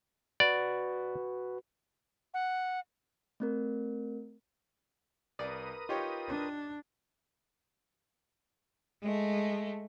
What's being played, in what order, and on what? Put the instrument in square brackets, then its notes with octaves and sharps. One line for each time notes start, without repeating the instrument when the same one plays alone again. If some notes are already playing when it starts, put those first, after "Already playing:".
[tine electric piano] F#4 B4 [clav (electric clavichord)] D5
[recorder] F#5
[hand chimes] A3 C4 A#4
[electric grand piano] C2 [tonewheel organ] A#4 B4 D#6 [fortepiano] D5
[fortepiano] D#4 G4 C#5 [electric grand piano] F4 G5
[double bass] D4
[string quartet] G#3 A3